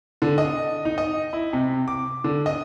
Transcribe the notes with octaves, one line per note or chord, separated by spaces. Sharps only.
D3
D#5
D#4
D#5
E4
C3
D6
D3
D#5